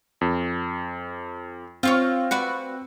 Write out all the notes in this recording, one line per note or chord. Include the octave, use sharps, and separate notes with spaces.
F2
C4 F4 C5 C#5
F#4 B4 D5